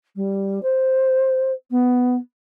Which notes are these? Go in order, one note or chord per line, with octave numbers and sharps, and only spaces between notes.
G3
C5
B3